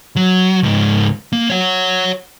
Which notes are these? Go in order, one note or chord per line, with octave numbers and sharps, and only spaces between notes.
F#3
C#2 G#2
A#3
C#5 F#5